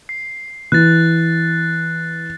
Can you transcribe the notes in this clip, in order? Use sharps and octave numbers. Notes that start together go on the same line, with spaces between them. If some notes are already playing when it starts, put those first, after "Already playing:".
C7
E3 F#6 A6